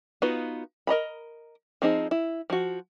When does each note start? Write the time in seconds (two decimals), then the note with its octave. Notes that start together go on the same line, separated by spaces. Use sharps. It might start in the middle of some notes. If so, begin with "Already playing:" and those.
0.22 B3 D#4 F4 F#4 B4
0.87 A#4 D#5 A#5 B5
1.82 F3 C4 D#4 G#4
2.11 E4
2.50 F3 F#4